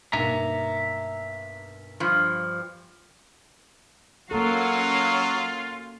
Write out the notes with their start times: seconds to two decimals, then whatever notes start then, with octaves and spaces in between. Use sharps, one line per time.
0.13 B1 G2 A#3 E5 A#5
2.00 G2 F3
4.31 F#3 A#3 C#4 F4 F#4 A4 F5